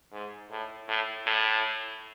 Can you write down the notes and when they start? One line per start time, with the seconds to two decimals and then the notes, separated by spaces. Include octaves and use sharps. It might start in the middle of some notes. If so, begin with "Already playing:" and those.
0.12 G#2
0.50 A2
0.88 A2
1.26 A2